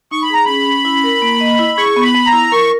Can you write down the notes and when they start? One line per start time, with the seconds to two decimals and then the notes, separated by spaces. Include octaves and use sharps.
0.11 D#4 C#6
0.23 B5
0.30 G#4 A#5
0.45 C#4 B5
0.66 C#4
0.85 E4
1.04 A#4
1.22 A#3
1.41 D#5
1.59 E4
1.78 G#4 C#6
1.96 B3
2.02 B5
2.15 B3
2.27 A#5
2.33 E4
2.52 A#4 C#6